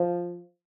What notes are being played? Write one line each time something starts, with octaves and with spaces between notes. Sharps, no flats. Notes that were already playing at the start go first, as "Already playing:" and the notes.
Already playing: F3